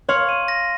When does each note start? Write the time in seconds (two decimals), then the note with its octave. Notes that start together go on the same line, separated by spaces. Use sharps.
0.09 C#5 F5 C6
0.29 D#7
0.48 A#6